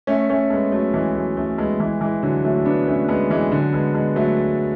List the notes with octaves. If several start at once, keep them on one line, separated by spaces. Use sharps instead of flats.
A3 C#4
A3 C#4
G#3 B3
F#3 A3
E3 G#3
F#3 A3
A3 C#4
G#3 B3
E3 G#3
E3 G#3
D3 F#3
F#3 A3
B3 D4
A3 C#4
G#3 B3
E3 G#3
D3 F#3
G#3 B3
G#3 B3
F#3 A3